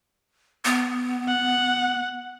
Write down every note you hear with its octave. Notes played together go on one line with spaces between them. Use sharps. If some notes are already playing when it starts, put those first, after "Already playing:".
B3
F#5